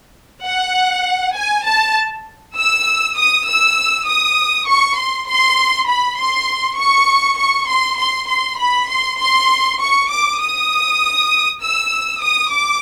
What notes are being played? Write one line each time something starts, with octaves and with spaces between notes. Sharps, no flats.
F#5
G#5
A5
E6
D#6
E6
D#6
C#6
C6
C6
B5
C6
C#6
C#6
C6
C6
C6
B5
C6
C6
C#6
D6
D#6
E6
D#6
D6